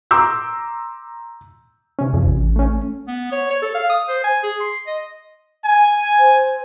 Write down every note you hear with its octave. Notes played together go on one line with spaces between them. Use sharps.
A#5 C6 D6 E6 G6
C3 C#4
F2
A1
A3 C#4
B3
C#5
C#5
A4
F5
D#6
C5
G#5
G#4
C6
D#5
G#5
C5